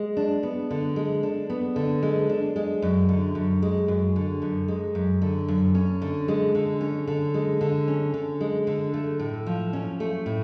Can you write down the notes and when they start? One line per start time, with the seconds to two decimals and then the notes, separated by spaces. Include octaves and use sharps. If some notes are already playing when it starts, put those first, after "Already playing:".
Already playing: G#3
0.17 D4
0.43 B3
0.71 D3
0.96 G#3
1.23 D4
1.50 B3
1.76 D3
2.03 G#3
2.29 D4
2.56 G#3
2.82 F#2
3.09 D3
3.35 F#2
3.62 G#3
3.88 F#2
4.16 D3
4.42 F#2
4.68 G#3
4.95 F#2
5.22 D3
5.48 F#2
5.75 C#4
6.02 D3
6.28 G#3
6.55 D3
6.81 C#4
7.07 D3
7.34 G#3
7.61 D3
7.88 C#4
8.14 D3
8.41 G#3
8.67 D3
8.94 A3
9.19 A2
9.46 F3
9.73 C#4
10.00 A3
10.26 A2